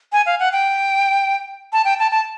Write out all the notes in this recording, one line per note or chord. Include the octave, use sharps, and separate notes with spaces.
G#5
F5
F#5
G5
A5
G5
A5
A5